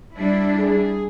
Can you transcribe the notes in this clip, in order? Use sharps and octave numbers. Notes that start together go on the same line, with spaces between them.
G3 D4 E4
G#4